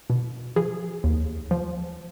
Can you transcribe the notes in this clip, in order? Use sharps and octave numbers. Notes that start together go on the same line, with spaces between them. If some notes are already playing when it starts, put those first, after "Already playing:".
B2
F3 G#4
D#2
F3